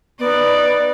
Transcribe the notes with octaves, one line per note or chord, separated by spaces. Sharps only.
B3 D#4 D5